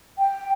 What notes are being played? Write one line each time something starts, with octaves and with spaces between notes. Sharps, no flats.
G5